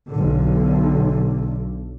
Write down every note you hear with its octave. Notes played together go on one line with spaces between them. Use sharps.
B1 D3